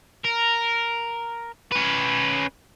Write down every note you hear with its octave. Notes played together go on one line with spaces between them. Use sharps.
A#4
C#4 B4